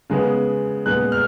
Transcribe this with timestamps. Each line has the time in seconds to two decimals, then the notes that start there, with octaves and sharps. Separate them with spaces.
0.10 C#3 G#3 B3
0.86 A#2 G#3 B3 F#6
1.12 F6